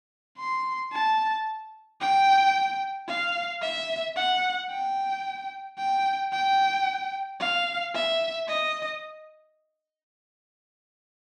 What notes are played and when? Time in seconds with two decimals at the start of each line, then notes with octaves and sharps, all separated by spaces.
0.38 C6
0.93 A5
2.00 G5
3.08 F5
3.62 E5
4.15 F#5
4.70 G5
5.78 G5
6.32 G5
7.40 F5
7.94 E5
8.48 D#5